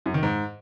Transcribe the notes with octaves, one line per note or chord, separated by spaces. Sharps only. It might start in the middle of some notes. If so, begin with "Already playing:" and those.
F#2
D#3
G#2